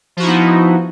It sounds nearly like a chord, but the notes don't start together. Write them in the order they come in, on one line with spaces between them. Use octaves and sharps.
F3 F#4 E4 D#4 B3